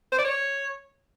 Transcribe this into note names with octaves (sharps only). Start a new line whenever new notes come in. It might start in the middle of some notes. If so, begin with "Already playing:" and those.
C5
D5
C#5